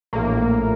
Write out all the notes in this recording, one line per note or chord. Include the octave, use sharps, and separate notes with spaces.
A#1 A2 A#3